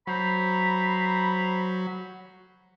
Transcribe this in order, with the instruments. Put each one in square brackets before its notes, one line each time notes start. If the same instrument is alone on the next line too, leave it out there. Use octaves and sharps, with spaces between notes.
[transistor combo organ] F#3 [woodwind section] C5 A#5 B5